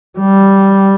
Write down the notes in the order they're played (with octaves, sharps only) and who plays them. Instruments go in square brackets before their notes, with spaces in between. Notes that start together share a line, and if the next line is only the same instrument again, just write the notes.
[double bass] G3